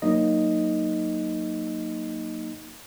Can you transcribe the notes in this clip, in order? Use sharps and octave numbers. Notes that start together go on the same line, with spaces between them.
F#3 A#3 D#4 D#5